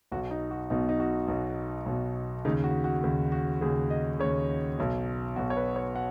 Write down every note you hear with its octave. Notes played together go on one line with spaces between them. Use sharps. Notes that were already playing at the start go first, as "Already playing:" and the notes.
B1 B2 F#4
D#4
F#4
B1 B2 D#4
D#4
F#4
B1 B2
B1 B2
D#2 C#3 D#4
F#4
F#4
D#2 C#3
F#4
D#2 C#3 G#4
D#5
D#2 C#3 C#5
B1 B2
B1 B2 F#4
C#5
B4
C#5
F#5